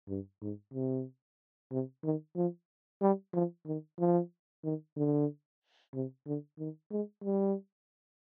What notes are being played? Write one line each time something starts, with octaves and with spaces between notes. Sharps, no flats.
G2
G#2
C3
C3
D#3
F3
G3
F3
D#3
F3
D#3
D3
C3
D3
D#3
G#3
G3